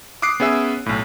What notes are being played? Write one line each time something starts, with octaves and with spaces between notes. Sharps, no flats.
D6 D#6 F#6 C7 D7
B3 C#4 G#4 E5 E6
B1 A2